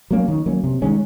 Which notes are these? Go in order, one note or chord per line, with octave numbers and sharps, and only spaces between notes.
F#3 A#3 C#4
D#3
F#3 A#3 C#4
C3
D#3 G#3 C#4